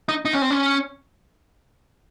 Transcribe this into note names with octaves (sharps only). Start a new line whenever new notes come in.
D#4
D#4
C#4
C4
C#4